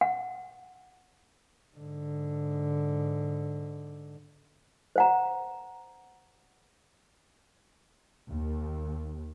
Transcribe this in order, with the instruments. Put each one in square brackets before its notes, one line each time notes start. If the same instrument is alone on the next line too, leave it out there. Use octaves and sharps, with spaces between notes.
[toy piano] F#5
[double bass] G#2 D3
[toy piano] C5 F#5 A#5
[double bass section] D#2